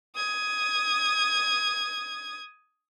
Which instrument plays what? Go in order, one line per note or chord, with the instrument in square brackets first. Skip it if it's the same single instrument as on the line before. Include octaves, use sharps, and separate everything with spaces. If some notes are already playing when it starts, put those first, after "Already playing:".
[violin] D#6 G#6